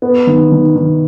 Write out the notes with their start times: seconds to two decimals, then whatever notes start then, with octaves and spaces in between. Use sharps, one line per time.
0.02 B3
0.27 D#3
0.52 D#3
0.75 D#3